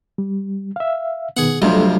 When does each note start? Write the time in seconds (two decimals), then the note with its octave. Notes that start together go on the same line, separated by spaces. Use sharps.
0.18 G3
0.76 E5 F5
1.37 B2 D#3 B3 G#4 F#5
1.62 B1 F2 C3 G3 A3 D4